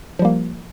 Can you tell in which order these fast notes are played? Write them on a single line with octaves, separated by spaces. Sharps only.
F3 G3 A#3